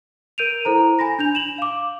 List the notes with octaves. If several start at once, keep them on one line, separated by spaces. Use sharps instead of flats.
A#4 G6 D7 D#7 F7
E4 A4 C5 A#5
G#5 B5 A#6
D4 G6 F7
E7 F#7
F5 D6